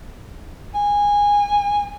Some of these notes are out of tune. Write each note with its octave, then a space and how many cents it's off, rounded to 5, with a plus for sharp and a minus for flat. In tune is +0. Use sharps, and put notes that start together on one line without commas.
G#5 -15